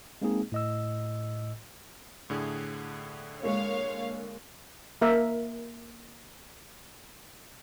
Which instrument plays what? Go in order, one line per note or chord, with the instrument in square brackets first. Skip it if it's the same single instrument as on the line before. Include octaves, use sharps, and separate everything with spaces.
[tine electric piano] G#3 A#3 C4 D#4 G#4
A2 D#5 E6
[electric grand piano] A2 D3 G#4
[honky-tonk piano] G#3 A#3 [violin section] C#5 F5
[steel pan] A#3 A#4 E5